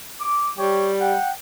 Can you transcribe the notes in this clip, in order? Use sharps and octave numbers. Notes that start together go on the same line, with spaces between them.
D6
G3 G4 C#5
F#5 G5